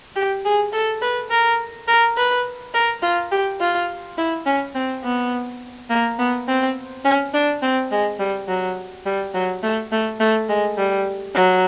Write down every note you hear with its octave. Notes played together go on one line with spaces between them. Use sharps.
G4
G#4
A4
B4
A#4
A#4
B4
A#4
F4
G4
F4
E4
C#4
C4
B3
A#3
B3
C4
C#4
D4
C4
G#3
G3
F#3
G3
F#3
A3
A3
A3
G#3
G3
F#3